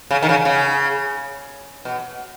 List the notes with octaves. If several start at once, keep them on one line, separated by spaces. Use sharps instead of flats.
C#3
D#3
C#3
C#3
B2